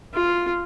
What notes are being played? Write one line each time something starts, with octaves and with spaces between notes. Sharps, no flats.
F4